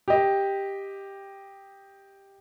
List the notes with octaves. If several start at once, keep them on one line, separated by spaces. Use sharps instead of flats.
G4 D#5